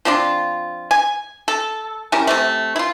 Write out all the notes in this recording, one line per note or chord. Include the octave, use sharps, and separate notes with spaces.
F3 C4 D4 F4
G#5
A4
G3 C#4 E4 A#4
C3 G3 A3
E4 F4